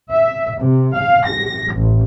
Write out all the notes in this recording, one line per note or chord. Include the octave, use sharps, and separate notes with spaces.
E5
C3
F5
A#6
A1